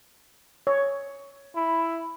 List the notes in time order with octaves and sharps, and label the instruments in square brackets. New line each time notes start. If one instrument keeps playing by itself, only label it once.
[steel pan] C#5
[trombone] E4